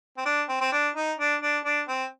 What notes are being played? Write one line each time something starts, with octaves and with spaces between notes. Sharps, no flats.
C4
D4
C4
C4
D4
D#4
D4
D4
D4
C4